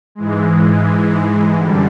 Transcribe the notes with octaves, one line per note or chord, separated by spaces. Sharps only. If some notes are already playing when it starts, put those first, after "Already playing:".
G#2 E3 G#3
F#2 D3 G3